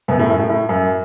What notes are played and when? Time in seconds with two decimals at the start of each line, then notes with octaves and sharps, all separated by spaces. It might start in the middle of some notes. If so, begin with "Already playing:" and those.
0.08 F#2 B2
0.19 A2
0.29 F#2
0.39 A2
0.49 A2
0.69 F#2